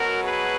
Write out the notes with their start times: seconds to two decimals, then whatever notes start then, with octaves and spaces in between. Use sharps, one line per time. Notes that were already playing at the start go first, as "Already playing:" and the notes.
Already playing: B2 F#3 F#4 A#4
0.24 G#4 B4